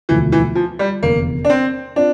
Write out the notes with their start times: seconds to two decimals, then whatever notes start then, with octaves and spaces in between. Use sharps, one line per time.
0.09 E1 D2 D3 E3 F3
0.32 E3
0.55 F3
0.79 G3
1.02 F1 E2 D3 A#3
1.45 D4
1.50 C4
1.96 C4 D4 F4